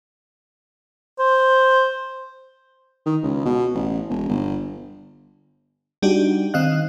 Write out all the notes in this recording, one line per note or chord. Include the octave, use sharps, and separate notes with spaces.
C5
D#3
C#2
B2
A1
E1
G1
G3 D4 D#4 F#4 G4
D#3 C4 D#4 D#5 F5 F#6